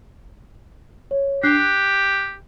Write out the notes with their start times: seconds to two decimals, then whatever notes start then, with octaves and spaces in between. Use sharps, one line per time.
1.11 C#5
1.43 D4 G4 F#6 C7
1.59 F#6